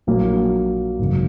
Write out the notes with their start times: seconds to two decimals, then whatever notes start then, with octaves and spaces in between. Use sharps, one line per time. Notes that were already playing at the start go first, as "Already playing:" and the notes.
0.07 A#1 A#2 F#3 A#3
0.99 G#1 F#2 C#3